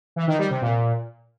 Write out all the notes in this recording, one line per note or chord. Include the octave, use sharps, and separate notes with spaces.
E3
D#3
G3
C3
A#2